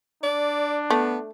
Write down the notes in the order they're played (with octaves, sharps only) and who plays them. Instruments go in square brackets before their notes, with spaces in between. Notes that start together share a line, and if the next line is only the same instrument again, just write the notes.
[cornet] D4 [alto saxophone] D5
[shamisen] A3 [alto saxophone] B3